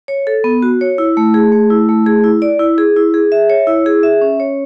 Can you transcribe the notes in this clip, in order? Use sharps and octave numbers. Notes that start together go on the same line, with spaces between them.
C#5
A4
B3
F#4
C#5
E4
A3
G#4
A3
E4
A3
G#4
E4
D5
E4
G#4
E4
G#4
E5
C#5
E4
G#4
E5
C#4
C#5